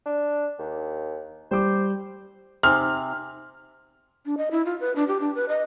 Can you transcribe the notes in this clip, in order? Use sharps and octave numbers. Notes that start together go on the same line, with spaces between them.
D4
D#2
G3 C5 D6
C3 D#4 C5 G#5 F6
D4
D#5
E4
F4
B4
D4
G4
D4
B4
D#5